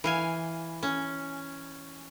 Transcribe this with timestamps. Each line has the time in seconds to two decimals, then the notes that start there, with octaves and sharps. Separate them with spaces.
0.04 E3 F5 G#5
0.83 C#4